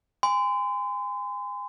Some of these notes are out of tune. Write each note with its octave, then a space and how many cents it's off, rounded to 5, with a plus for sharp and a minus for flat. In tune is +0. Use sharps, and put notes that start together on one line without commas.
G#5 -30 C6 -40